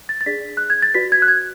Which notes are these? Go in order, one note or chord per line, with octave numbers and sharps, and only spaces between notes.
A6
A6
D4 G#4 D5 B6
F#6
G#6
A6
F#4 B4 D5 B6
G#6
F#6
G#6